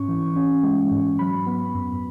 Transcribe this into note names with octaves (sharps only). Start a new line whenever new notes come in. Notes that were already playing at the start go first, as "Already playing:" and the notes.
Already playing: G#2 C#4 C#6
E3
C#4
G#3
G#2
F#3 B5
B3
F#2